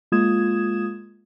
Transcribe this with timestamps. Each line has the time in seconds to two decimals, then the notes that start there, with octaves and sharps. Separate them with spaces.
0.12 G#3 A#3 F4 D#6 G#6 E7